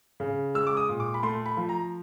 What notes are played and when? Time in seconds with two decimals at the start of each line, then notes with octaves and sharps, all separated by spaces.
0.20 C#3
0.55 G#3 E6
0.67 D6
0.77 D#6
0.89 A#2
1.00 D6
1.14 B5
1.23 A3 C6
1.46 B5
1.57 F3
1.69 A#5